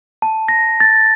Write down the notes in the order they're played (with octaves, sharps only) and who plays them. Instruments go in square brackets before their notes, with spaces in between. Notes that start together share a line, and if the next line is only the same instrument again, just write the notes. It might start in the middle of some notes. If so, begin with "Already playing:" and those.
[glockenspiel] A5
A#6
A6